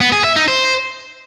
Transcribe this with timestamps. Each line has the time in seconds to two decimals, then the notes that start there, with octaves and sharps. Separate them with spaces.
0.01 B3
0.12 G#4
0.24 E5
0.36 D#4
0.48 C5